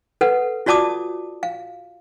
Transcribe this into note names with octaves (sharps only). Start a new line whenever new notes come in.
A4 B4 F#5
F4 F#4 D5 A5 D6 D#6
F5